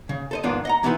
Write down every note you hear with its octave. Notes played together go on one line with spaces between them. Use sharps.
C#3
A4 C5 D#5
G#2 D#3 F3 B3 D4 F4
D#5 F#5 A#5
E3 B3 D#4 E4 B4 C5